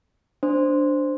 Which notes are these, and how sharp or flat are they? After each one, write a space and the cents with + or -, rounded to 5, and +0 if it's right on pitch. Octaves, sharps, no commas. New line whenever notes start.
D4 +0 C5 -5